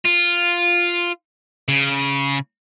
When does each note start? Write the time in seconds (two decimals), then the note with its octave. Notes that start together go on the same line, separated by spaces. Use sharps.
0.05 F4
1.68 C#3